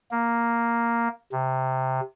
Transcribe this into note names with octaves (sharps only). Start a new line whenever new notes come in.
A#3
C3